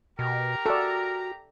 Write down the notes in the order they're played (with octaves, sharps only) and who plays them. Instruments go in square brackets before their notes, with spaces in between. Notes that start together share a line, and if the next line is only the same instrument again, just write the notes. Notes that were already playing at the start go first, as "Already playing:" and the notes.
[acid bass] B2 [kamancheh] G4 A#5 [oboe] A#4
[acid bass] F#4 [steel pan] A4 D5